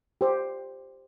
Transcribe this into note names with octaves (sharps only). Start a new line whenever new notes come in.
G4 C5